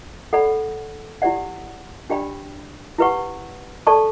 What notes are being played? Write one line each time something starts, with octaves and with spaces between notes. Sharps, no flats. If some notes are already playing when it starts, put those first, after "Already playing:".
A4 D5 F#5 B5
E4 G4 D5 F#5
D4 G4 D5 G5 B5
E4 G4 B4 F#5 C#6
A4 D5 A5 C#6